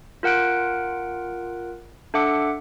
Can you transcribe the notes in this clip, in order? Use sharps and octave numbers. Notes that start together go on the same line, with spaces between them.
F4 A#4 F#5 F#6 D7
D4 A4 E5 F#5 D6 C#7